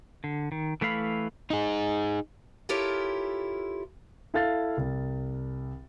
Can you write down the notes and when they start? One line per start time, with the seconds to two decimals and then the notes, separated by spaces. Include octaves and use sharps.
0.24 D3
0.52 D#3
0.81 E3 A3 E4 F5 B5
1.50 D#4 G#4
2.69 E4 F4 G4 A4 A#4 C#5
4.34 E4 A4 F5 A6
4.77 C2